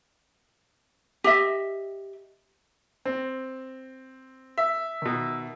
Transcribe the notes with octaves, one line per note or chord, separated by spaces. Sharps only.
G4 D#5 E5
C4
E5
B2 D#3